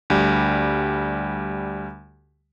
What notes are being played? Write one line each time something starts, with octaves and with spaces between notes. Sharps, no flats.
D2 G3